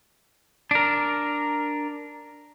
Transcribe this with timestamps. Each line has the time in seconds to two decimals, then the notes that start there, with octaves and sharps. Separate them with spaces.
0.71 D4 A#4